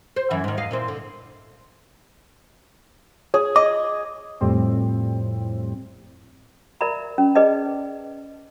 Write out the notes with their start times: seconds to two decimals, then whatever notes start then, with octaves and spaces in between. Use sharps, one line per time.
0.16 C5
0.30 F#2 E3 E5
0.44 G#2 D#3
0.57 E2 D#5 F5
0.71 A#2 E3 C4
0.88 D3
3.34 G#4 C#5
3.56 D#5 D6
4.41 F2 A2 G3 C4
6.81 A#4 D5 E5 A#5 B5
7.18 C#4
7.35 G#4 B4 D5 D#5 A5